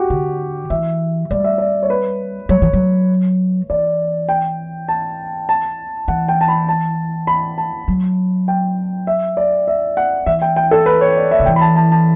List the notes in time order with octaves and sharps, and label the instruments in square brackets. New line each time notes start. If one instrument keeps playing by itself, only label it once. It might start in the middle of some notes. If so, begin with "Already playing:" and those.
Already playing: [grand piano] F#4 G4
[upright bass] D3
[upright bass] E3 [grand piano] E5
[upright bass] G3 [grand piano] D5
[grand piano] E5
D5
C#5
B4
[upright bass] F#3 [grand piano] C#5
[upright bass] E3
F#3
[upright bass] E3 [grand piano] D5
[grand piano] G5
A5
A5
[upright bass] E3 [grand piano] F#5
[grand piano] G5
A5
B5
A5
B5
A5
[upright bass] F#3
[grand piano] G5
E5
D5
E5
F#5
[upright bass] E3 [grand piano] E5
[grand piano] G5
G5
A4
B4
C#5
D5
E5
[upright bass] D3
[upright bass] E3 [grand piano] G5
[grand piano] B5
A5
A5
A5